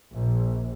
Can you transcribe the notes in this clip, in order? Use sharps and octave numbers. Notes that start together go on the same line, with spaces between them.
A#1